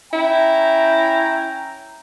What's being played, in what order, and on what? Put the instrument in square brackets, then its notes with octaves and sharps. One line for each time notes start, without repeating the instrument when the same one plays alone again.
[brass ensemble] C#4 G5 A#5 [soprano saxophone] E4